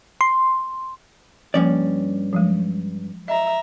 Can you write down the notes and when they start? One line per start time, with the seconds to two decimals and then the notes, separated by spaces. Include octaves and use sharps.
0.21 C6
1.54 G2 F3 A#3 C#4 D5
2.33 F3 F#3 G#3
3.28 D#5 E5 A#5